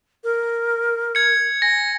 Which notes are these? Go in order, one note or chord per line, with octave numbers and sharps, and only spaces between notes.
A#4
G#6 C#7
G#5 A#6